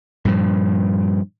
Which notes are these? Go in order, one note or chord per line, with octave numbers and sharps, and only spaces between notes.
G2 A#2 F3